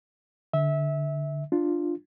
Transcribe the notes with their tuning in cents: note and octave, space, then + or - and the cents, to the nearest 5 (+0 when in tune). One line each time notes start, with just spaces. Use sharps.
D3 +0 E5 -20
D4 +15 F4 +0